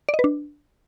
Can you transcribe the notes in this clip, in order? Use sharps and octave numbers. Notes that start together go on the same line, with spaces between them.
D5
D#5
B4
D4